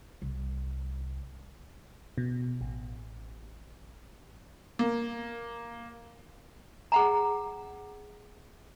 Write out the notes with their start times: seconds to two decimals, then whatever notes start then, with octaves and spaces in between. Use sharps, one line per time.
0.22 C2
2.18 B2
2.61 A1
4.79 A#3
6.92 G#4 F#5 A#5